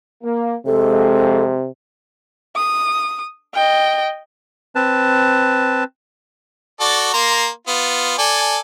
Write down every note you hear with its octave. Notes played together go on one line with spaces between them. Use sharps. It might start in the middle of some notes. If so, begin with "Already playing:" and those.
A#3
F2 C3 G#3 A4
D#6
D#5 G5
C4 B4 A5
F#4 A4 D5
A#3 A#5 C6
B3 F4
A4 D5 G#5